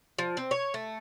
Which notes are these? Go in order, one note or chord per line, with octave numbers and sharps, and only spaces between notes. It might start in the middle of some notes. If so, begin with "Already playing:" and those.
F3
C4
C#5
A3